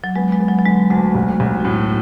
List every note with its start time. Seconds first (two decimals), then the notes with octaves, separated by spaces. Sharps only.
0.04 F#3
0.16 G#3 B3
0.32 G#3
0.40 B3
0.48 F#3
0.58 F#3
0.65 D3 G#3
0.90 D2 A3
1.15 B1
1.40 B1
1.60 F#3
1.65 A2 G#3